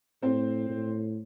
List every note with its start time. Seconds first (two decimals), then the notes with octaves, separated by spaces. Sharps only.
0.22 A2 C4 C5
0.70 A2